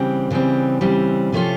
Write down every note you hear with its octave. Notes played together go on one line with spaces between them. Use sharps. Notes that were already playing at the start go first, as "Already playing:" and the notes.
Already playing: C#3 E3 G3 C4
C#3 E3 G3 C4
C#3 E3 G3 C4
C3 F3 A3 C#4 F4